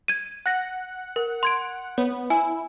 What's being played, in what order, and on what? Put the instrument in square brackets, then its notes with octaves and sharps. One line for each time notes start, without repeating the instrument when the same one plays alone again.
[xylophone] G#6 D#7
[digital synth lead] F#5 [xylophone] F#6 A#6
[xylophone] A#4
C6 G#6 D7
[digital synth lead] B3 [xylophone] C#5
[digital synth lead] E4 [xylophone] G#5